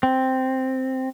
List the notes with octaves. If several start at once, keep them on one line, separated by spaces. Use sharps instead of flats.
C4